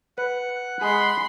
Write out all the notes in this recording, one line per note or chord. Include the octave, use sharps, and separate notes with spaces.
B4 F#5
G#3 G#4 B5 C6